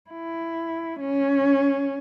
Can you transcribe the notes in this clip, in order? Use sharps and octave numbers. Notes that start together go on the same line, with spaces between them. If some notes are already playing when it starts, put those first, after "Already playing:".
E4
C#4